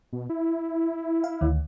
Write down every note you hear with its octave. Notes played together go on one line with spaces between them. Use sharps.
B2
E4
F5
D2 D#3